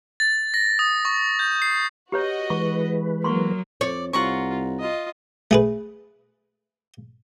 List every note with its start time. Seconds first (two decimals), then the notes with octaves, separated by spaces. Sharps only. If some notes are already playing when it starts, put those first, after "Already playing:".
0.20 A6
0.54 A#6
0.79 D#6
1.05 C#6
1.39 G6
1.62 C7
2.12 F#4 G4 B4 C#5 D#5
2.50 E3 G#3 B4 C#6
3.24 F#3 A#3 C6 C#6
3.81 F2 C#5 D5
4.13 C2 F4 F#5 A#5 C#6
4.80 F4 D#5
5.51 A3 G#4 B4